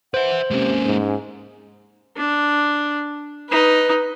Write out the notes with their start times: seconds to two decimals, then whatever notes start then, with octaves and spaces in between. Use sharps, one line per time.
0.14 B4 C5 E5 F#5
0.51 C3 G#3 A#3 C#4
0.86 G#2
2.16 D4
3.48 D#4 B4